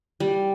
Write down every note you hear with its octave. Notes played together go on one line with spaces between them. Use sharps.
G3